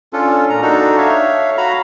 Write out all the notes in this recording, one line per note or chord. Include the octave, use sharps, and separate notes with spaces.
C#4 D4 F4 A4
A#2 A#5
D4 D#4 F#4 A4
C#5 E5 F5
F#4 F5 A#5 B5